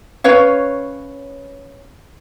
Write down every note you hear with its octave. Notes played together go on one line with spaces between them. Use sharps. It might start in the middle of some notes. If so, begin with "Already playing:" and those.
C#4 B4 C#5 F5